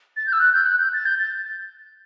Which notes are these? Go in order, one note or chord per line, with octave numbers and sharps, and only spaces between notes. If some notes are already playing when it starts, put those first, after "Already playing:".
A6
G6
E6
F#6
G6
F#6
G6
A6
G6
A6